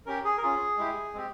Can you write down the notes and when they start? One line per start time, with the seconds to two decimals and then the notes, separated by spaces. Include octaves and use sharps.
0.06 C#4 G4 A#4
0.24 G#4
0.38 A#4
0.42 C#4 F4 G#4
0.78 G#3 E4 G4
1.14 G#3 C4 G4